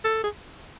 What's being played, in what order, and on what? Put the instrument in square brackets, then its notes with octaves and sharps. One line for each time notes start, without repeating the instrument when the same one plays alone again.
[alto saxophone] A4
G#4